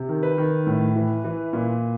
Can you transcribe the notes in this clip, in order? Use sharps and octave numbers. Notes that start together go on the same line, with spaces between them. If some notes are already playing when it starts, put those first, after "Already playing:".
Already playing: C3
D#3
B4
D#3
A2
E3
E3
A#2